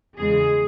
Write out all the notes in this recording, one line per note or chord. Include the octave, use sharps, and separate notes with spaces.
E2 C#3 G#3 G#4